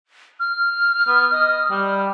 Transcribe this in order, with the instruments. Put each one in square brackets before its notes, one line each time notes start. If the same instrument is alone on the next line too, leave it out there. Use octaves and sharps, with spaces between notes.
[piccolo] F6
[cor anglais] B3
D#5
G3